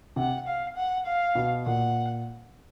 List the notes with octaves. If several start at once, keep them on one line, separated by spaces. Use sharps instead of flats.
C3 F#5
F5
F#5
F5
B2
A#2 F#5